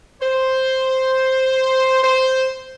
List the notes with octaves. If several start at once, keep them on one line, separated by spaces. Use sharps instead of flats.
C5
C5